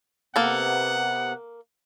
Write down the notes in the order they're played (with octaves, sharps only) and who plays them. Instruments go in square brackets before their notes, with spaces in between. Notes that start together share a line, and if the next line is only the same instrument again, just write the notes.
[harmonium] C3 B3 [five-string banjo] A#3 A4 [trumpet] F#5